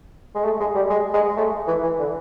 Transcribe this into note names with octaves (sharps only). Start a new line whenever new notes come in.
G#3
A3
G#3
G3
G#3
G#3
A3
E3
E3
D3